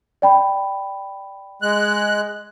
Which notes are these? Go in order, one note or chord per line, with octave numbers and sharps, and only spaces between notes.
D5 G5 B5
G#3 F#6